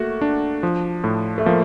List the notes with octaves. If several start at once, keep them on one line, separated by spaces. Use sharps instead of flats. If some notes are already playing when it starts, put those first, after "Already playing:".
Already playing: A3 A#3 F#4
D4
F3
A2
A3
F3 A#3